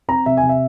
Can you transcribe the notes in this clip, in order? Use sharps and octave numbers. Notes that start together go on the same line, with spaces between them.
C4 A#5
C3 E5
G#5
C3
E5